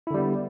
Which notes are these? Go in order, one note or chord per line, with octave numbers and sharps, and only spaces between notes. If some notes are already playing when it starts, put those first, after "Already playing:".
D3 G3 B3 E4